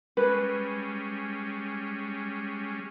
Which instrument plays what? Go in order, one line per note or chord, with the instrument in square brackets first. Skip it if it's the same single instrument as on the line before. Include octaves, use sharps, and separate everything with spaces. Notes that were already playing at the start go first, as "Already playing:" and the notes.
[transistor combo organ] G3 G#3 C#4 [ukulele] B4